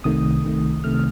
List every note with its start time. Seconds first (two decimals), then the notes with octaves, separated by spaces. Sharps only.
0.04 C2 C3 D#3 A3 D#6
0.44 C2 C3 D#3 A3
0.84 C3 D#3 A3 F6